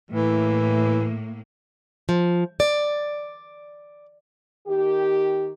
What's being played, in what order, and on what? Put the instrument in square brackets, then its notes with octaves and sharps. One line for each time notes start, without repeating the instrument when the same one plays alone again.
[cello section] A2 A#3 [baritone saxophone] E3
[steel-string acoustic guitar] F3
D5
[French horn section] D#3 G4